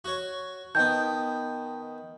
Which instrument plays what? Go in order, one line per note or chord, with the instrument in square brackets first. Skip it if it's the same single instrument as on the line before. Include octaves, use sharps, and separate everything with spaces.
[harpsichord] F#4 C#5
[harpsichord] D#3 B3 [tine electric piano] D#5 G5 A5 [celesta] G6